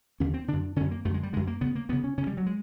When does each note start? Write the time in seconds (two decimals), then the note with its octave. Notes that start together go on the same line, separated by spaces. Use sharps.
0.20 D#2 D3 C#4
0.34 C4
0.48 F#2 D3 D4
0.76 F#2 D3 C#4
0.91 A#3
1.05 F#2 A3
1.09 D3 G#3
1.23 G3
1.33 F#2 D3 G#3
1.47 A#3
1.61 D2 C#3 B3
1.75 A#3
1.89 D2 C#3 B3
2.04 C#4
2.18 C#3 C#4
2.22 D2
2.27 G3
2.37 F#3
2.46 G#3